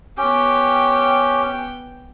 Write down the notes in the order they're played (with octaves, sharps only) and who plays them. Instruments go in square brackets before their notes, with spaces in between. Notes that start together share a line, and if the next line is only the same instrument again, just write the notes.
[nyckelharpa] B3 G5 [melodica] C#4 G4